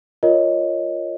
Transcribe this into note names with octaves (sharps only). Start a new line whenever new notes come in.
F4 A#4 C#5 D#5